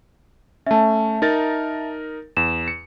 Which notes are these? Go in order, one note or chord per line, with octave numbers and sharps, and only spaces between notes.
A3 C#4 E5 A5
D#4 A#4 A6
E2 E7
C#7